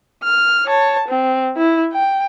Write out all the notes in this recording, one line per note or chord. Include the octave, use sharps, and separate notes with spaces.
F6
C#5 A5
C4
E4
G5